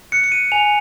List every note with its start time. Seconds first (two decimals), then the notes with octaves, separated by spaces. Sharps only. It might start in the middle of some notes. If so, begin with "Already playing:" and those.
0.12 F#6 C#7
0.24 C#7
0.32 D#7
0.52 G#5 F7